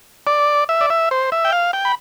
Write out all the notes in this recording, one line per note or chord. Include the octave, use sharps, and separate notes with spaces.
D5
E5
D5
E5
C5
E5
G5
F5
G5
B5